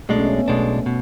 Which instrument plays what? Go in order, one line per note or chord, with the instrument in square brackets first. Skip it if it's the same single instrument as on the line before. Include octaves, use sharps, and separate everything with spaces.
[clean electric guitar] B1 B2 G#3 D4 [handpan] A3
[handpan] C#4
B3
[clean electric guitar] B1 B2 G#3 D4 [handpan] A3
[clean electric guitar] B2